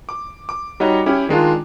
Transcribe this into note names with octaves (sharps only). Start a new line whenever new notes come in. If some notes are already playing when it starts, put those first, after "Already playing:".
D6
D6
G3 D#4 F#4 C#5 D#5 F#5
C#4 E4 G4
D#3 G#3 D4 F4